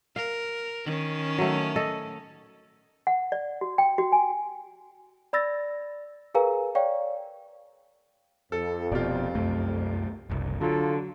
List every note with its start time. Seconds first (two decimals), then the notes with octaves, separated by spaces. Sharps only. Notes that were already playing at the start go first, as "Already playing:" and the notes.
0.16 A#4 F5
0.86 D#3 C#4
1.38 F#3 A3
1.76 A4 D#5
3.07 F#5
3.32 D5
3.61 F#4
3.78 G5
3.98 F#4
4.12 G#5
5.33 D5 B5 E6 A6 A#6
6.34 G#4 A#4 B4 F5 G#5 A#5
6.75 C#5 D5 F5 G5 C#6
8.52 F2 A4
8.92 F1 B2 F4 G4 D5
9.35 C2 F#2 A3
10.30 F#1 C2
10.61 D3 F#3 F4 A4